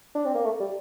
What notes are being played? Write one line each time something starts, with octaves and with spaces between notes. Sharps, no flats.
D4
C4
A#3
A3
G3